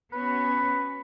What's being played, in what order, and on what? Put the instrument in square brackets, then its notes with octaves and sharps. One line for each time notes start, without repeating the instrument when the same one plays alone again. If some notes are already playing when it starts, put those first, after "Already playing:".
[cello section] B3 C#4 F#4 [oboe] B4